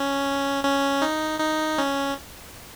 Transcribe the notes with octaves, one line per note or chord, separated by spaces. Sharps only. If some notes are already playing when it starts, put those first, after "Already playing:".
Already playing: C#4
C#4
D#4
D#4
C#4